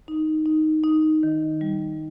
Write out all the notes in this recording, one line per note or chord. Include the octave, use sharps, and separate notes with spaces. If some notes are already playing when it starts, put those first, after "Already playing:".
D#4
D#4
D#4
D#3
G3